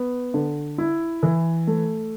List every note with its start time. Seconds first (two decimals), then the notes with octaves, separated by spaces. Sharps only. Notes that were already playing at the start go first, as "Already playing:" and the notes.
Already playing: B3
0.34 D3
0.78 E4
1.23 E3
1.67 A3